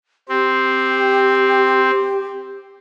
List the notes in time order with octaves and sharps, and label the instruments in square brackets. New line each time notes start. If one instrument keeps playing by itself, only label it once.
[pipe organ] C4 [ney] G4